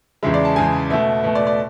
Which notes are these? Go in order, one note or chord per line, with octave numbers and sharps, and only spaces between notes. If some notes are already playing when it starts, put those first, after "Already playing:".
E2 C#3 G#3 E5
D5
A5
E2 C#3 G#3 G#5
B2 A3 E5
B2 A3
D5
D5